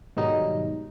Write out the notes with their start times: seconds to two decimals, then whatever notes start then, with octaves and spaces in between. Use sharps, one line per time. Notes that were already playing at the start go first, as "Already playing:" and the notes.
0.17 G#2 B2 D#3 F#3 G3 D#4